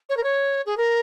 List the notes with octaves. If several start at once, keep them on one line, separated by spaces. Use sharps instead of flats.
C#5
A#4
C#5
G#4
A#4